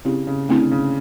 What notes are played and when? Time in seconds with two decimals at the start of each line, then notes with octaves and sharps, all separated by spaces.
0.05 C#3 C4 E4 G4
0.27 C#3
0.49 D3 A3 C4 E4
0.71 C#3